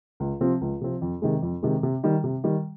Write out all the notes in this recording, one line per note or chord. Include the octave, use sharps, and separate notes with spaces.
C#2
C3 F3 C4
C#2
C3 F3 C4
F2
C3 D#3 G#3
F2
C3 D#3 G#3
C3
D#3 G3
C3
D#3 G3